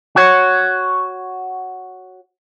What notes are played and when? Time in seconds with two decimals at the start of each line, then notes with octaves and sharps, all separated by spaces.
0.16 F#4 C#5